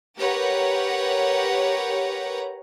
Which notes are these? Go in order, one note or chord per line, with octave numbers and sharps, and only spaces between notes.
G4 A#4 B4 C#5 F#5 A#5